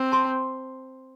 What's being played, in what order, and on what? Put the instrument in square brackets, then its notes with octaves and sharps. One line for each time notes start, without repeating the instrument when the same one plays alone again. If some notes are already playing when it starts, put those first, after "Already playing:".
Already playing: [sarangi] C4
[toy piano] A5 C6